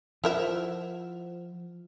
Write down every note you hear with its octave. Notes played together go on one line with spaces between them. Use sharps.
F3 E4 F4 A#4 C5 E5 F#5